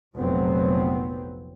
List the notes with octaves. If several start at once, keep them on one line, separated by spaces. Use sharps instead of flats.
F1 A#1 F#3 B3 C4